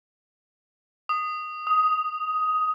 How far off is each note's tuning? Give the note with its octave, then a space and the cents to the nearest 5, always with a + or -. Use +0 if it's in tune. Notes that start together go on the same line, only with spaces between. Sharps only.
D#6 -10
D#6 +10